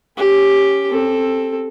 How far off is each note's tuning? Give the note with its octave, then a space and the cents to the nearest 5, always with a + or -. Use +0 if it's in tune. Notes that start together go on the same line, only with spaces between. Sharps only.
C#4 +0 G4 +5
C4 +20 A4 +0